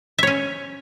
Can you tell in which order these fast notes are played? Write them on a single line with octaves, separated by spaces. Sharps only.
E5 C#5 C#4